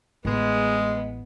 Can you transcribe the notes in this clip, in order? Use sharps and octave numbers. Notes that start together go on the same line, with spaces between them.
A1 G#3 B3